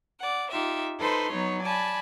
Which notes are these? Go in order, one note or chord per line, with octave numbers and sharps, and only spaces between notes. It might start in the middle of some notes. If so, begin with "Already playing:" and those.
D5 F#5
D#4 F4 G4 E5
D#4 A4 B4 C5 C6
F#3 B3 D#4 C#5
D5 G#5 A5 B5